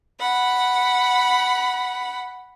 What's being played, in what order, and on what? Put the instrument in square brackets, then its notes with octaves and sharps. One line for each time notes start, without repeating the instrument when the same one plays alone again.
[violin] F#5 B5